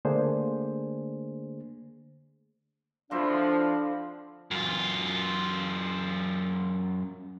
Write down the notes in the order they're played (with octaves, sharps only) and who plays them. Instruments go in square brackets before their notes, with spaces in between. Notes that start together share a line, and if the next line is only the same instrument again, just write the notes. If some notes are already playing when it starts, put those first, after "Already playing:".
[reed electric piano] D3 A3 A#3 D4 G#4 C5
[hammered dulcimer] D3 C4 E4 [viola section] F3 [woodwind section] D4 [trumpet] F5
[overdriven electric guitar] F#2 F4